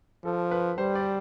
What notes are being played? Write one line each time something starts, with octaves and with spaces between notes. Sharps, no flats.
F3 A4
B4
G3 C5
D5